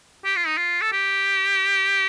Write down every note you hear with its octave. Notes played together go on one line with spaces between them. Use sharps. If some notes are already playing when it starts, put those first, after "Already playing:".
G4
F4
D#4
F4
A4
G4